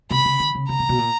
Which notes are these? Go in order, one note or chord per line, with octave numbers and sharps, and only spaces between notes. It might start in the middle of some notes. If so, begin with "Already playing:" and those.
C3 B5
C#3
D3
C#3
C#3 A#5
C3
B2
A#2